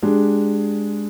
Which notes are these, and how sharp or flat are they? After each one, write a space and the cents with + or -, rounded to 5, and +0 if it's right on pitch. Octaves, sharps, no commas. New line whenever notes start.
G#3 +0 D4 +0 G4 +0